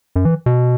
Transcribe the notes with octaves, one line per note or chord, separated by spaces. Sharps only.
F#2
E3
B2